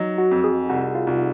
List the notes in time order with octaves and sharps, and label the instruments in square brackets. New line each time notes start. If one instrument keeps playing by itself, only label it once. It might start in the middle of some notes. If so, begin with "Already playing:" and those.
Already playing: [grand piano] F#3 [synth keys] D#4
[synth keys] F#4
[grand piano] F2
[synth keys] G#4
[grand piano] C2 [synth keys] F#4
[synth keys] F4
[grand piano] C2